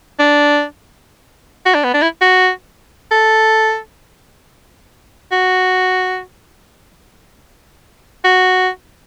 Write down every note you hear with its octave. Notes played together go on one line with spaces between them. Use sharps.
D4
F#4
D4
B3
D4
E4
F#4
A4
F#4
F#4